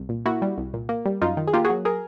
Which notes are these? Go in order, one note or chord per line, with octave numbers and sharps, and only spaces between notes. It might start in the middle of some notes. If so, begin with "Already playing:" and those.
Already playing: C2
A#2
A#3 E4 F#4
G3
C2
A#2
A#3
G3
F#2 D#4 F4
D#3
G#4
A#3 F4 G4
F#4 G#4
F#3
G#4 A#4